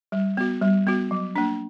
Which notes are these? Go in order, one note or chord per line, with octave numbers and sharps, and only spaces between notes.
G3
B3 F#4
G3
B3 F#4
F#3
A#3 D4